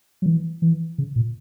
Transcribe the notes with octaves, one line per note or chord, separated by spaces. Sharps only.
F#3
E3
E3
C#3
A#2